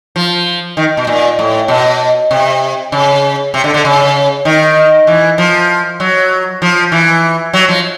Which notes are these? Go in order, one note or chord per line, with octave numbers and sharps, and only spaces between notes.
F3
D#3
B2
A#2
A2
B2
C3
C#3
C3
D3
D3
C#3
D#3
E3
F3
F#3
F3
E3
F#3
F3